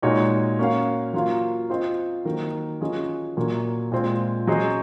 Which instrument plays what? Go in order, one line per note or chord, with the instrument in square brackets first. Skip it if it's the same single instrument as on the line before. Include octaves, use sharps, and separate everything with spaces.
[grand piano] A#2 G#3 D#4 F#4 C#5
A#3 C#4 F#4 C#5 F5
F#3 A#3 F4 C5 F5
C4 F4 C5 D#5
D#3 F#3 A#3 D#4 A#4
F#3 C#4 F4 G#4 D#5
A#2 F#3 A#3
A#2 G#3 C4 F4
F#3 C#4 G#4 C5 D#5